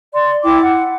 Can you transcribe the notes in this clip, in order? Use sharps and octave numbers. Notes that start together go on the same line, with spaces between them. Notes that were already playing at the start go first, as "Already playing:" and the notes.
D5 C6
E4 G5 D6
F#5